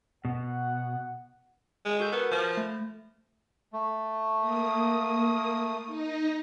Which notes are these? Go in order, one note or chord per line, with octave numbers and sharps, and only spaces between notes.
B2 F#5
G#3
F#4 A4 G6
B3 A#4 B4
F3
A3
A3
A#3 D#6
D#4 D#5